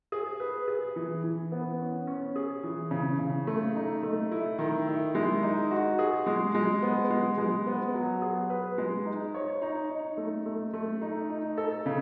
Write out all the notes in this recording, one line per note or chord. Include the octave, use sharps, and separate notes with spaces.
G#4
B4
G#4
E3
E3
B3
C#4
C#4
G#4
E3
C#3
C#3
A3
D#4
A3
E4
D#3
E4
G#3
D#4
F#4
G#4
G#3
G#3
B3
G#3
G#3
B3
F#3
G#4
B4
G#3
D#4
C#5
D#4
D#4
A3
A3
A3
D#4
D#4
A4
C#3